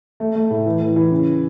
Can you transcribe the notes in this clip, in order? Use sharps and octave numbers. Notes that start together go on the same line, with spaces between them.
A3
A3
A2
E3
E3
E3
C#3